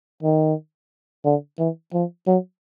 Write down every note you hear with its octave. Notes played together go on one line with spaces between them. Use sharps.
D#3
D3
E3
F3
F#3